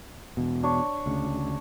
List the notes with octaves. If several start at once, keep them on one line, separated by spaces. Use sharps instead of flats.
E2 B2
D4 C#5
D2 C#3